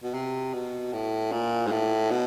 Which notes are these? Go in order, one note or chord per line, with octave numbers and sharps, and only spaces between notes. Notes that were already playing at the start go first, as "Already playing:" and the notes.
B2
C3
B2
A2
A#2
G#2
A2
B2